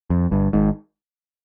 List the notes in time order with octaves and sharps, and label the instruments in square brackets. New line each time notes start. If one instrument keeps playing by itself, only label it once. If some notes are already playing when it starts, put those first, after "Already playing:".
[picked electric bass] F2
G1 G2
G#1 G#2